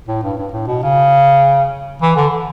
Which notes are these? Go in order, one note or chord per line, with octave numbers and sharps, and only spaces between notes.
A2
G2
G2
A2
B2
C#3
E3
D3